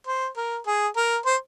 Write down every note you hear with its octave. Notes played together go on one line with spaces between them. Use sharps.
C5
A#4
G#4
A#4
C5